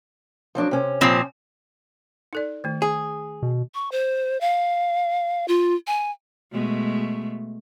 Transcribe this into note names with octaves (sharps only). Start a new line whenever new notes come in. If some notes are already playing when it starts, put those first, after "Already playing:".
F3 F#3 D4
C3 C#4
A#2 F3 C4
D#4 A4 D5
D#3 A3
G#4
B2
C#6
C5
F5
F4
G#5
B2 G#3 A3